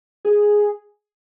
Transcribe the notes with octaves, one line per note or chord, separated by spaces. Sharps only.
G#4